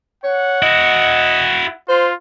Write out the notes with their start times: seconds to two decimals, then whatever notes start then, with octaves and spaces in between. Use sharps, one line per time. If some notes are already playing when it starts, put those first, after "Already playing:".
0.24 C#5 F#5
0.62 E4 F#4 D#5
1.89 F4 C5